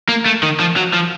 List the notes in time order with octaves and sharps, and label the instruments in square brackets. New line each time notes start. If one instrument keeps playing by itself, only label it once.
[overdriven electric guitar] A#3
A3
D#3
F3
F#3
F3